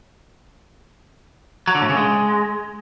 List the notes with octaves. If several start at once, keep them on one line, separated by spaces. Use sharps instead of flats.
F#3
D3
A2
C#3
G#3